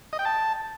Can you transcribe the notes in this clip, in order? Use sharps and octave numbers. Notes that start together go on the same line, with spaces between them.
D#5
G5
A5